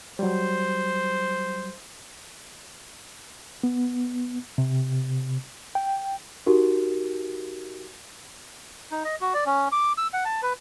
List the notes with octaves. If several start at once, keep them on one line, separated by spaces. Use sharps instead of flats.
F#3 G3 C5
B3
C3
G5
D#4 F#4 G4 A#4
D#4
D#5
F#4
D5
C#4
D6
E6
F#5
A5
B4